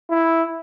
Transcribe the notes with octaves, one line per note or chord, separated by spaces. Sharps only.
E4